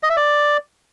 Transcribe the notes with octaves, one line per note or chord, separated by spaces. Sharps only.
D#5
E5
D5